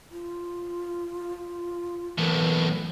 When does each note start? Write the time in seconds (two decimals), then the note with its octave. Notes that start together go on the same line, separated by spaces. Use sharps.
0.12 F4
2.18 B1 A2 E3 A#4